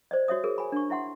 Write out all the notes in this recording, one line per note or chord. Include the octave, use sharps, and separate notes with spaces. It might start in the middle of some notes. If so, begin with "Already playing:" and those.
C5 D5 D#5
F#4 C#5 E5 D#6
G#4 A#4
G#5 B5
D4 C#6
E4 E5 F#5 C6